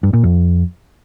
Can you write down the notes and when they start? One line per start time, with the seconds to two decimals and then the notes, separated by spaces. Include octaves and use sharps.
0.03 G2
0.13 A#2
0.23 F2